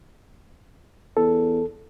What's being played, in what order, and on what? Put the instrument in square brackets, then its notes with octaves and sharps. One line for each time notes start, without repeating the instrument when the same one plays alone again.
[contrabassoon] E2 [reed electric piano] A4